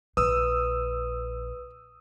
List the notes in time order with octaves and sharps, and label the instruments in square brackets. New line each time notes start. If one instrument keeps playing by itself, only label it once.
[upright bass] A#1 [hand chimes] B4 [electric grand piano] D#6 E6